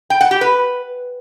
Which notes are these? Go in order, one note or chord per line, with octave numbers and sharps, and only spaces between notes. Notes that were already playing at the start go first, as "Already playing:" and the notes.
G5
F#5
G4
B4